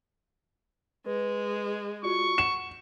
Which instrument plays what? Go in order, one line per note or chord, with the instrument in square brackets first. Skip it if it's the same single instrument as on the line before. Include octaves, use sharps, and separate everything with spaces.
[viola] G#3 [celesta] B4
[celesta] F4 F#4 D5 [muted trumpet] C#6
[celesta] F#5 [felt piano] E7